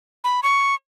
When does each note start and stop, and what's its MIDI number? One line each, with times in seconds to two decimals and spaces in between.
0.24 0.40 83
0.43 0.75 85